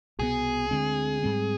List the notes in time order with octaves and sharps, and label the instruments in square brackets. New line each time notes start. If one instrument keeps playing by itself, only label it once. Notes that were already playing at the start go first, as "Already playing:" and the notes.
[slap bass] C2 B2 B3 [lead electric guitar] G#4
[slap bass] D2 D3 G#3 C4
G#2 G3 C4